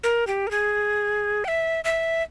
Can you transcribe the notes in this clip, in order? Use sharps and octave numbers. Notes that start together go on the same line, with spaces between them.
A#4
G4
A#4
G#4
G5
E5
E5